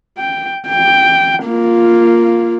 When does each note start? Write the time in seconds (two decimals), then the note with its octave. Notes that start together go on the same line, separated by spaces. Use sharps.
0.18 G5
0.68 G5
1.44 A#3 F4